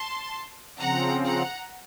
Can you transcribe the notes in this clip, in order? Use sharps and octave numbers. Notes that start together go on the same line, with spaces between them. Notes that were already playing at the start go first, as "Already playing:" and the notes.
Already playing: A5 C6
C#3 F3 C4 F#5 A#5
F#5 A#5